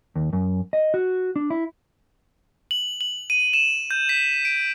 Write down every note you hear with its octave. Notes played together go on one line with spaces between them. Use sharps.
D#2
F#2
D#5
F#4
D4
E4
F#7
F#7
D#7
E7
G6
B6
D7